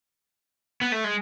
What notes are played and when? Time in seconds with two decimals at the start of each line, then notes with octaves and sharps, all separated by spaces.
0.81 B3
0.92 A3
1.04 G#3